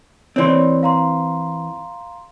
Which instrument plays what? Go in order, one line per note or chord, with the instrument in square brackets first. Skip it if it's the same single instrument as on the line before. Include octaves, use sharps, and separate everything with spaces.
[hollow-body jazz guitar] E3 C4 [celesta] C#5 D5 C6
[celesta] F5 A#5 C6